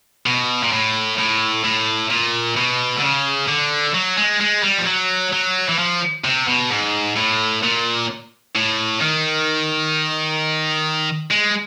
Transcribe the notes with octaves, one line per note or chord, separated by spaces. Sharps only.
B2
A#2
A2
A2
A2
A#2
B2
D3
C#3
D3
F#3
G#3
G#3
G3
F3
F#3
F#3
E3
F3
C3
B2
G#2
A2
A#2
A2
D#3
G#3